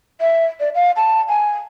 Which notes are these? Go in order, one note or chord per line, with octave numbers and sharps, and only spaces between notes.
E5
D5
F5
A5
G#5